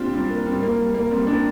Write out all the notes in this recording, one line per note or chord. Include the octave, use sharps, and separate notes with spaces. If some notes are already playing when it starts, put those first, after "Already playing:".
Already playing: C4 D4 F4 G4
G3 C4
A#3
G3 C4
A#3
G3
A#3
G3 C4
A#3 D4